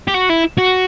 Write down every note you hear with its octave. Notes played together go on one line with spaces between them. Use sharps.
G4
F#4
E4
F#4